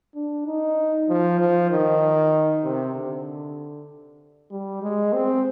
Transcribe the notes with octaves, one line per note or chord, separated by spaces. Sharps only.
D4
D#4
F3
F3
D#3
C3
D3
G3
G#3
C4